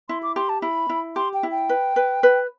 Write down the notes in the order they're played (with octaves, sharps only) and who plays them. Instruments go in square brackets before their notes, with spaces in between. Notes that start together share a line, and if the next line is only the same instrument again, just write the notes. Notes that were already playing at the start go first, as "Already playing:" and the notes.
[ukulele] E4 [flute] C6
[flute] D6
[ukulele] G4 [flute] C6
[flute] A5
[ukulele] E4 [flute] B5
[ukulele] E4
[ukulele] G4 [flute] C6
[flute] G5
[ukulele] E4
[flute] G5
[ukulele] B4
B4
B4